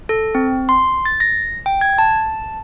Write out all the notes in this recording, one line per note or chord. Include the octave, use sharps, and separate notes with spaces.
A4
C4
C6
A6
A#6
G5
G#6
A5